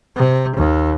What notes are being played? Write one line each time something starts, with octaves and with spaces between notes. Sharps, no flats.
C3
D#2